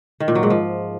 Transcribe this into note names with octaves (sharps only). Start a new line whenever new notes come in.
D#3
A#2
F#3
G#2
F3